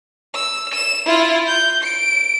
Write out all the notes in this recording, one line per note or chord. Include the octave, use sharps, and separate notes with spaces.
E6
E7
E4 F4
G6
D7